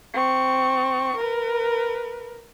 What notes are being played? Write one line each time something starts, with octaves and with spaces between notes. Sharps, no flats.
C4 C#6
A#4 B4